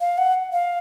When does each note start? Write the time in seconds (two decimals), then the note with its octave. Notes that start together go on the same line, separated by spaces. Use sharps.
0.01 F5
0.18 F#5
0.53 F5